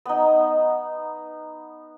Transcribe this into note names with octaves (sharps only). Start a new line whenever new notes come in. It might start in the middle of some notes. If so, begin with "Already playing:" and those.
B3 D#4